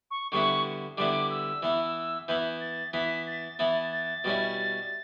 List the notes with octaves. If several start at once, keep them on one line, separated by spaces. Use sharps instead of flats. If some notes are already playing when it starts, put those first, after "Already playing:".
C#6
D3 G3 B3 E4 C#6
D3 G3 B3 E4 D6
E6
E3 B3 E4
E3 B3 E4 G6
A6
E3 B3 E4 B6
A6
E3 B3 E4 A6
A6
B2 G3 C#4 E4